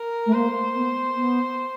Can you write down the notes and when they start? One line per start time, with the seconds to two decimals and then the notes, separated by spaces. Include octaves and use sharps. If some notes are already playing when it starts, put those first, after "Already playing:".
Already playing: A#4
0.26 A3
0.34 A#3 C5
0.75 B3
1.15 B3